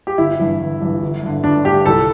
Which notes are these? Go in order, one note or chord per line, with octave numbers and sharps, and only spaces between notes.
G4
G1 E4
G2 E3
G1
G2 E3
G1
G2 D3
G1 D4
G2 D3 G4
C2 A4